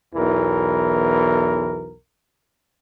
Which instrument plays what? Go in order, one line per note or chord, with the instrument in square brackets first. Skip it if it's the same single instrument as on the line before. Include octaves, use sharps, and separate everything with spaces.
[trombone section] B1 E2 E3 A#4